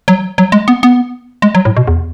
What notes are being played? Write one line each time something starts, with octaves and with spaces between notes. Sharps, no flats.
F#3
F#3
G#3
B3
B3
G#3
F#3
A2
B2
E2